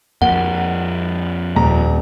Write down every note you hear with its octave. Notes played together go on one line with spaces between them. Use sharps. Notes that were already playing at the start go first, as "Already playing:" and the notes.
F2 A#3 F#5
D#1 A#5